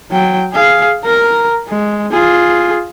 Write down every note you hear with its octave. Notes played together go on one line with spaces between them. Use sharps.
F#3 G5
G#4 F5
A#4 A#5
G#3
F4 G#4